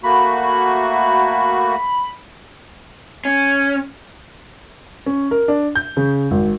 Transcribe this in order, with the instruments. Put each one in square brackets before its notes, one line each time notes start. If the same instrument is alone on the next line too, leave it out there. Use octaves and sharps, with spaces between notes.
[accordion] A3 A#3 F#4 [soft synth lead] B5
[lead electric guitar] C#4
[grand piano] C#4
A#4
D4
G6
C#3
G#1